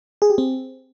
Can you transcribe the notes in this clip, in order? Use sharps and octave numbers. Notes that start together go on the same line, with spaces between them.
G#4
G4
C4